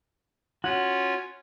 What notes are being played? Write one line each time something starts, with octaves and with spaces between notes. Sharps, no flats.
C#4 F4 F#4 C#5